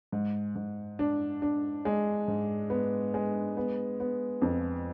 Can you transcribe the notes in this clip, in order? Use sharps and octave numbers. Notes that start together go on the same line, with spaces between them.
G#2
G#2
D4
D4
G#3
G#2
B3
G#3
B3
B3
F2